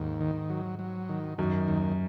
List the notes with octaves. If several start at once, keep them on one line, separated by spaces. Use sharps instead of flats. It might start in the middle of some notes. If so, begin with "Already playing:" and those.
Already playing: D#2 G#2
D#3
F#3
F#3
D#3
F#2 D#3
D#2